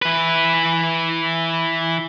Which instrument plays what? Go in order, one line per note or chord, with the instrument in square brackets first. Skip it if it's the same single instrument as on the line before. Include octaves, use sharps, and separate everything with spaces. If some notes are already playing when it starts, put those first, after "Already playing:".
[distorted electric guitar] E3 B4